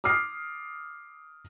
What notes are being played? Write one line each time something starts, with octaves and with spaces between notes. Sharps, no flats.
D6 D#6 F6 C7